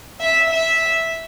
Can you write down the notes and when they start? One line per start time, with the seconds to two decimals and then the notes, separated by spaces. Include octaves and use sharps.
0.21 E5
0.50 E5